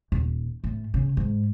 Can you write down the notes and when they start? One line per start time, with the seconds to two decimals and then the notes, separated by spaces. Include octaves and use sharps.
0.12 D#1
0.64 A2
0.94 C#3
1.17 G#2